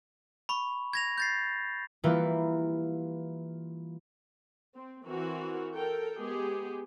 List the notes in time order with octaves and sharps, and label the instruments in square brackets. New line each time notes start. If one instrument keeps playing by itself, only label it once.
[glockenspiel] B5 C#6
G#6 A#6 F7
G6 A6 C7
[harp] E3 G3 A#3 E4 F4 B4
[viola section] C4
E3 C4 F#4 A#4
A4 A#4 G5
G#3 B3 G4 G#4